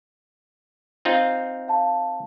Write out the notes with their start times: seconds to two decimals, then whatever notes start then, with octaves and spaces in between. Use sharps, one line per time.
1.05 C4 D#4 F4
1.68 F5 A5